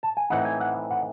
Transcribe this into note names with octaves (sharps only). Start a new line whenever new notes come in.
A5
G#5
A2 E3 C4 D#4 F#5
G#5
F#5
F#5